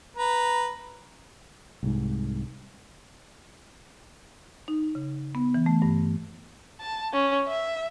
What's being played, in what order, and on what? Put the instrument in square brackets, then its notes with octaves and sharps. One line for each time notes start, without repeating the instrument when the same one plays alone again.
[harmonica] B4 A#5
[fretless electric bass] C2 G#2
[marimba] D#4
C#3
B3
E3
A3
G2
[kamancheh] A5
C#4
E5